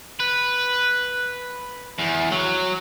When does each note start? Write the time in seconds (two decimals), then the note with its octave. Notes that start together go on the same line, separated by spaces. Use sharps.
0.20 B4
1.99 E2
2.32 F#3